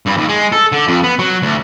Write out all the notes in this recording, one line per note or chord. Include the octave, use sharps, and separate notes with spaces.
G2
D#2
G#3
A4
D3
F2
B3
F#3
D2